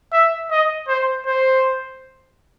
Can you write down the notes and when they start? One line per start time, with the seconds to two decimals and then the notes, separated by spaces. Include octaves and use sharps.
0.12 E5
0.51 D#5
0.88 C5
1.26 C5